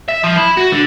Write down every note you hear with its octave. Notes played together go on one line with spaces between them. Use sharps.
E5
F3
E4
F#4
D3